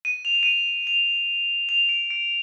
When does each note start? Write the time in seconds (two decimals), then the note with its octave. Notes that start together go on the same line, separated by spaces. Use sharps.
0.05 D#7
0.25 F7
0.35 F7
0.43 D#7
0.51 F7
0.87 F7
1.69 F7
1.89 D7
2.10 D7